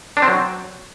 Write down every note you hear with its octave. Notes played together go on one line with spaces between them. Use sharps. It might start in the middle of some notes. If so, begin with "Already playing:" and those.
D4
C4
F#3